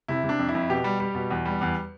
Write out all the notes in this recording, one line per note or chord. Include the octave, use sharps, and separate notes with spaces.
C3 E4
C3
D4
F2
E4
F2
B2 G4
G3
G3
B2
E2
G3
E2